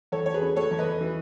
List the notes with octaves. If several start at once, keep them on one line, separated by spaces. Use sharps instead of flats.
E2 A4 C#5
C#5
G#4 B4
C#3
A4 C#5
E2
B4 D#5
E3